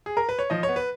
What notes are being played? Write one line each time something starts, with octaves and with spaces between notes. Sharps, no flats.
G#4
A#4
B4
C#5
F3 D#5
C#5
B3
B4